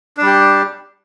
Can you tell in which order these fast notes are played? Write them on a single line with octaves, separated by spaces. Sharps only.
D4 G3 G4